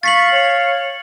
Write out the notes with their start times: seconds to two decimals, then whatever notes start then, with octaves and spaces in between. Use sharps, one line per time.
0.03 F5 C#6 A6 B6 F#7
0.32 C#5